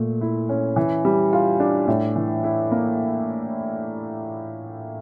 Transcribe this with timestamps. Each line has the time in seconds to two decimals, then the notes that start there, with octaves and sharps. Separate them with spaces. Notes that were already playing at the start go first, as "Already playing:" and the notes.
Already playing: A#2 A3
0.21 E4
0.49 C#4
0.76 E3
1.05 G3
1.33 F4
1.60 D4
1.87 A2
2.16 E3
2.44 E4
2.71 A#3